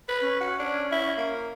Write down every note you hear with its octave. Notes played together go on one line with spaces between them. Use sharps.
B4 B5
C#4
F#4
D4
E4
A#3